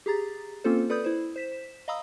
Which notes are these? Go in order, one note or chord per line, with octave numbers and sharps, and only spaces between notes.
G4 G#4 A#5 A6
A#3 C4 C#4 F4 A4 C5
A4 B4 D5 B5 D#6 G6
E4 C5
C5 B6 E7
D#5 F5 A#5 B5 D#6 E6